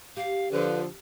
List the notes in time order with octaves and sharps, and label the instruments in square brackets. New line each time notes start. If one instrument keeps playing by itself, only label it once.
[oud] G4 [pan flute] F5
[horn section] D3 F3 [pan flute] B4